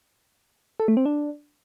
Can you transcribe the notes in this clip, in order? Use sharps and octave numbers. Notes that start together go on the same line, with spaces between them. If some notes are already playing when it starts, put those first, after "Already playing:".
A4
A3
C4
D4